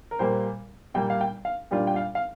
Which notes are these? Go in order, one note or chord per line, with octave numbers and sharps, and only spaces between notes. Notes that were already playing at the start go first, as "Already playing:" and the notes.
A#4
A#2 G3 A#3 C5
A#2 G3 A#3 G5
F5
G5
F5
A#2 G3 D4 F4
G5
F5
F5